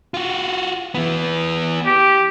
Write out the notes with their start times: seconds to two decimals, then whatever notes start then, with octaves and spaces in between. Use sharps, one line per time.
0.14 F4 F#4
0.95 E3 B3
1.87 G4